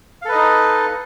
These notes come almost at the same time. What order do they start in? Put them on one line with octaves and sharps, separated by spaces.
F5 A4 B4 D#5 D#4